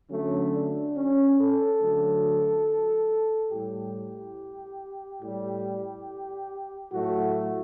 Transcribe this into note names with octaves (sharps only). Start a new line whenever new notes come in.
D3 F#3 A3 C#4
D4
C#4
A4
D3 F#3 A3
A2 G3 G4
A2 G3
A2 F#3 A3 F#4